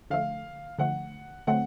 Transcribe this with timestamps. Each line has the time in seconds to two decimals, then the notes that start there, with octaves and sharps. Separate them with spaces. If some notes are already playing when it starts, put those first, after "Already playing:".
0.10 D3 F3 A3 F5
0.79 D3 F3 A3 F#5
1.47 D3 F#3 A3 C4 F#5